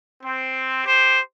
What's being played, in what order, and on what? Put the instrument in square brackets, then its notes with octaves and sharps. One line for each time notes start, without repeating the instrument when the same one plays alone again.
[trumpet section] C4
G4 C5